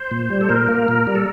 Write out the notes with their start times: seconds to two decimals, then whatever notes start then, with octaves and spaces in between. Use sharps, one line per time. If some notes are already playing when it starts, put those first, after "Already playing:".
Already playing: C5
0.11 A#2
0.30 G3
0.41 A4
0.49 A#2 A#4
0.68 A#3
0.88 A#2
1.07 G3
1.15 A4